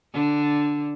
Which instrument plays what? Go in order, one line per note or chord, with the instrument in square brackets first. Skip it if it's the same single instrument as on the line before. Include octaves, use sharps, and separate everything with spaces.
[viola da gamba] D3 D4